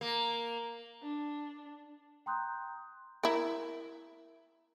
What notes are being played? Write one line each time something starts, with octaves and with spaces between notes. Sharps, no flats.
A#3
D4
G5 A#5 C6 D#6 F#6 G6
E4 A#4